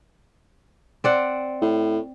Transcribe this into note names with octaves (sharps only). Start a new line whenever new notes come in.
C4 D5 F#5
A2